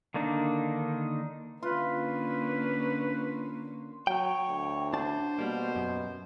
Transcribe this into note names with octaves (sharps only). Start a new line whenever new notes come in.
D3 D#3 A#3 D4 D#4
D3 A#3 C#4 F4 B4
F#3 C#5 G5
D2
D4 C5 A5
B2 G3 A#3
F#2